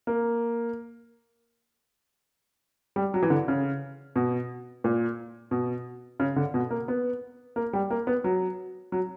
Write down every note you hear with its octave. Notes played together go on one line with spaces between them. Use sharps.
A#3
G3
F#3
E3
D3
C#3
B2
A#2
B2
C#3
D3
B2
A#3
B3
A#3
G3
A#3
B3
F#3
F#3